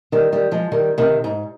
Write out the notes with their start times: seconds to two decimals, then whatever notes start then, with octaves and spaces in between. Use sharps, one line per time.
0.12 D#3 G3
0.32 D#3 G3
0.51 F3 G#3
0.72 D#3 G3
0.98 C3 D#3
1.24 G#2